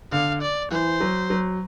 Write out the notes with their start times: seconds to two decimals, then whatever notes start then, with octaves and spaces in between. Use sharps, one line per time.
0.12 D3 F5
0.42 D5
0.71 E3 C5
1.00 F#3
1.30 F#3